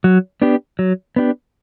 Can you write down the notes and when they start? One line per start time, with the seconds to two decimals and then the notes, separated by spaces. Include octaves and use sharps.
0.04 F#3
0.42 B3 D4 G4
0.79 F#3
1.16 B3 D4 G4